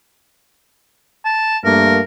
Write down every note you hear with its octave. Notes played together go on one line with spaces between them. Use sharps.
A5
G2 A3 A#3 A#4